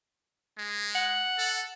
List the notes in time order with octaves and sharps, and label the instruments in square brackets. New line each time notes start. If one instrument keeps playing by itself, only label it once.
[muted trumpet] G#3
[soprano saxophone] F#5
[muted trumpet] A4